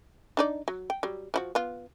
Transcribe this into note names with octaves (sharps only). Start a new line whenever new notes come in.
D4 D#4 D5
F#3
G5
F#3 G3
F3 E4 F#4
B3 F4